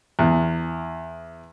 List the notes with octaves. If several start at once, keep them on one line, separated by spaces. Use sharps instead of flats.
E2